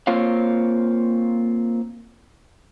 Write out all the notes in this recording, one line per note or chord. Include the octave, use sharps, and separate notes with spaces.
A#3 C4 F4 C#5 F5